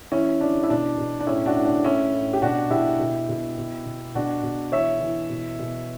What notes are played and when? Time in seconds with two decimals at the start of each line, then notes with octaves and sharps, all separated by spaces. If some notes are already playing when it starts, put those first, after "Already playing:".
0.12 E3 C#4 E4
0.41 E3 D4
0.63 E4
0.70 B2 D4
0.98 B2
1.20 D4
1.27 A2 C#4 E4
1.46 D4 F#4
1.56 A2
1.65 D4
1.85 A2 C#4 E4
2.13 A2
2.33 G4
2.42 B2 D4 F#4
2.70 B2 E4 G4
2.99 B2
3.29 B2
3.58 B2
3.86 B2
4.15 B2 D4 F#4
4.43 B2
4.72 E3 C#5 E5
5.00 E3
5.29 B2
5.59 B2